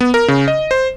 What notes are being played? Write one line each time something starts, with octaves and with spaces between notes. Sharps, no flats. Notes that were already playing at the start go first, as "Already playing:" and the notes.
B3
A#4
C#3
D#5
C5